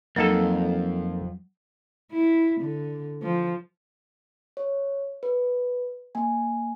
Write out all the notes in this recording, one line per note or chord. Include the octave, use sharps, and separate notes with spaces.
F2 F#3 A#3 D#4 A4
E4
D3
F3
C#5
B4
A#3 G#5